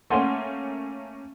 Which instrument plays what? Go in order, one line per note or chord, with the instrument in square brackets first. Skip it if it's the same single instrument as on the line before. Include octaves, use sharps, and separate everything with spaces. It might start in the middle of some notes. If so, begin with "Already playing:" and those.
[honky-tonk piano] A3 A#3 C#4 [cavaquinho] F#5 G#5 C6